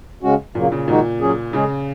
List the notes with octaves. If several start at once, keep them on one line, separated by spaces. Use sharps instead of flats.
C#3 G#3 C#4 F#4
A#2 C#3 F#3 A#3
C#3
A#2 D#3 G#3 D#4 F#4
F#3 C#4 G#4
C#3 G#3 C#4 G#4